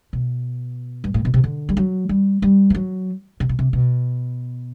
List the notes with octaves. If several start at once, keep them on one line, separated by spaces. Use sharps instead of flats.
B2
G2
A2
B2
C3
D3
G3
F#3
G3
G3
E3
F#3
C3
B2
C3
B2